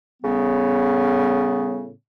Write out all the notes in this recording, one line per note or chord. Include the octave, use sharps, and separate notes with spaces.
A2 C#3 G3 B3